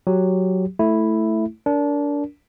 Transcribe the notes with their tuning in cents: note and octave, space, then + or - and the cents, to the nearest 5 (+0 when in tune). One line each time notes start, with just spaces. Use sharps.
F#3 +0 G4 +0
A3 +0 E4 +0
D4 -25 A#4 +0